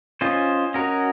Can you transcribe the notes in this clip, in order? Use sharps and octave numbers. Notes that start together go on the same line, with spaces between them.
C#4 F4 C5 D#5
C#4 F#4 A#4 D#5